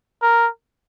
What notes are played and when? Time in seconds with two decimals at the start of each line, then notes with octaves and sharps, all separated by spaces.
0.22 A#4